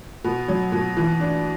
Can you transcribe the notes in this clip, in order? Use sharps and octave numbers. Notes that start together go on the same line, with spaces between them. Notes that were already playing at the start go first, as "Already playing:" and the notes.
B2
F#3
B2
E3
D4